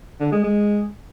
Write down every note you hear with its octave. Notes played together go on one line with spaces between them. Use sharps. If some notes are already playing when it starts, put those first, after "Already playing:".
D3
G#3
G#3